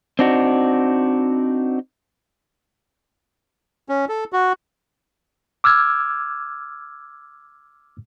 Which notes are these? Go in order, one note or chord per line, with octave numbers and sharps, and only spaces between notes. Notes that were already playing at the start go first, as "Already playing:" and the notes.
C4 D4 D#4 F#4
C#4
A4
F#4
D6 E6 F6 G#6